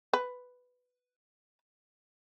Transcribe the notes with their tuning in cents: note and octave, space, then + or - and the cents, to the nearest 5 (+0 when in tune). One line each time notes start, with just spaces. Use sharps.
B4 +5